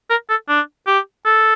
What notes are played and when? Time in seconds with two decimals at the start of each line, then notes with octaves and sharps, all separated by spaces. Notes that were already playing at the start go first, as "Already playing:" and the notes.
0.10 A#4
0.29 A4
0.48 D4
0.87 G4
1.25 A4